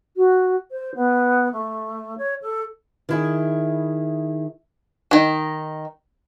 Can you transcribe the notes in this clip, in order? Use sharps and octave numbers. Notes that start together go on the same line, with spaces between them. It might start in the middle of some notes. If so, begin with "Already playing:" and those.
F#4
C5
B3
A3
C#5
A4
D#3 E4 G#4
D#3 D#4